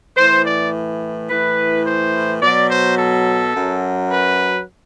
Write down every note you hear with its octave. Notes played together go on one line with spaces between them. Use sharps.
A2 E3 C5
D5
A2 E3 B4
C5
B2 F#3 D5
C5
A4
F#2 F#3
B4